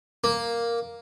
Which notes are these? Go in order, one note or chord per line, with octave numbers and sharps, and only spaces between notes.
A#3